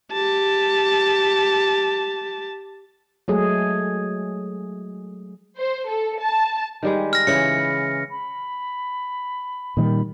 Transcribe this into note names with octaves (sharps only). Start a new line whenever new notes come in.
G4 A5
F#3 G#3 A3 G#4
C5
A4
A5
D#3 G3 G#3
F6 A#6
C#3 E3 C#4 C#7
B4
B5
A#2 D#3 G3